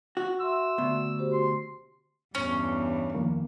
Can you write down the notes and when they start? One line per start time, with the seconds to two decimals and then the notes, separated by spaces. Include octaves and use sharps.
0.17 F#4
0.40 E5 C6 E6
0.78 D2 B2
1.19 F#4 G4 C5
1.33 C6
2.35 E2 G2 C#4
3.15 F2 D#3 A#3